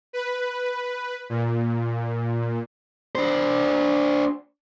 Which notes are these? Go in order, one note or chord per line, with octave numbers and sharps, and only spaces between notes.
B4
A#2
D4 C5